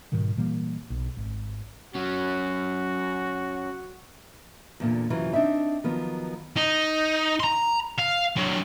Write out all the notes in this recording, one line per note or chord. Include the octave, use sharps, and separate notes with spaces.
G#2 B2 D#3 G3
A#2 E3 G3 A#3
B1
G#1
F#3 C#4 F#4
E2 A#2 D3
F#2 C3 E3 F#3 C4 F4
C4 D4 D#4 E5
D#3 F3 F#3 B3
D#4
A#5 C6
F5
D3 F#3